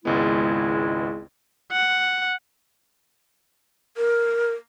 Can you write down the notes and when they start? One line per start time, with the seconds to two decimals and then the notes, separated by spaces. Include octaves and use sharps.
0.05 G#1 C#2 G#3 B3 E4
1.72 F#5
3.97 A#4